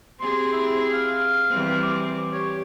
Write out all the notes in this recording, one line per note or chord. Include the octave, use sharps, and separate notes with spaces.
C4 G4 G#4 C6
E4
F5
E3 G3 C4
D6
G4 C#5